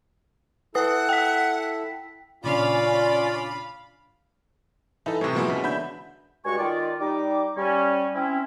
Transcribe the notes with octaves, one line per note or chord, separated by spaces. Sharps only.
E4 A4 B4 F#5 D#6
G5 B6
A#2 C#3 C#4 D4 F4 D5 F5 B5
E3 D#4 A4
A2 C3 C#5
B2 F3 G#3 A#3 E4
C#3 B4
D3 E5 B5 G6
C#2 G2 G#3 F#4 G#5 C#6
D#3 F4 D5
G3 D#4 D6
G3 C#4
C4 C#4 E4